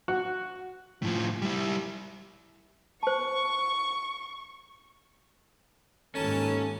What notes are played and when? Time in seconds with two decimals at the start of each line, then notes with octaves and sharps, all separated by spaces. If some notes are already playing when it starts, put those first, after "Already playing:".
0.08 F#4
1.02 A2 F3
1.42 G3 E4
3.03 C5 A5 C#6
6.15 D#2 G#2 E3 C#4 A4 A#4 A5